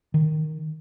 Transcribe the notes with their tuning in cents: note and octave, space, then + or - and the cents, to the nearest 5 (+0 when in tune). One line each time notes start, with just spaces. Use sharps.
D#3 -5